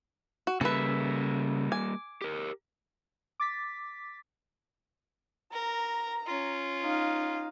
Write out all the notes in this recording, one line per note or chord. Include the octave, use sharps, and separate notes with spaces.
F#4
C#3 G3 A#3 A4 B4 E5
G#5 D6
G4 A#4
D6 A6 B6
A#4 A#5
C#4 F4
D#4 F5